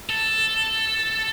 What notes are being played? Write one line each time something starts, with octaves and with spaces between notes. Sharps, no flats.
A4